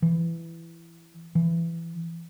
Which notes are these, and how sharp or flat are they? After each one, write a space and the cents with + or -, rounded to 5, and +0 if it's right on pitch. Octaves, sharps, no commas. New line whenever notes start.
E3 +15
E3 +20